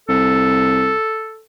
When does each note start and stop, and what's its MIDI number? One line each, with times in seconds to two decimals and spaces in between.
0.09 0.92 36
0.09 1.42 69